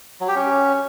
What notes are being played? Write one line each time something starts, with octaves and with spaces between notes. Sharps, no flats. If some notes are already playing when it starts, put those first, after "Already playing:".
F#3
G4
C#4